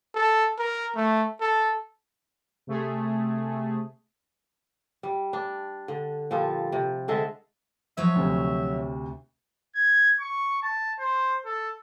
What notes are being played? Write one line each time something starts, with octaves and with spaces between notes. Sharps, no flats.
A4
A#4
A3
A4
C3 A3 G#4
G3
D4
D3
A#2 F3 G3 A4
C3
D3 G#3 A4 E5
F3 F#3 C#5 E5
D2 C3
G#6
C#6
A5
C5
A4